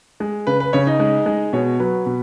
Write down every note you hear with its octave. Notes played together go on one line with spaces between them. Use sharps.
G#3
C#3 B4
B4
C#3 C#5
D#4 D#5
G#3
G#3
B2 C#5
F#3 B4
B2